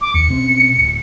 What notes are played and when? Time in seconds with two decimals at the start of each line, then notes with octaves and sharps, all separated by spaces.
0.01 D6
0.14 D#2 C#7
0.29 B2 C4 C#4
0.78 D1